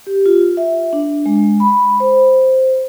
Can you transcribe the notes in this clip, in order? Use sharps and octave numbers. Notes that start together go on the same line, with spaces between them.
G4
F4
E5
D4
G#3
B5
C5